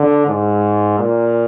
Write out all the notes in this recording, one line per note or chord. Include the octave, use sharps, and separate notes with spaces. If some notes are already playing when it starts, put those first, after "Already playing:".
Already playing: D3
G#2
A#2